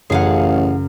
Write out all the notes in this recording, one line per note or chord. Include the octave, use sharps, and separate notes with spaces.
A1 F#2 C#3 G#4 F5 F#5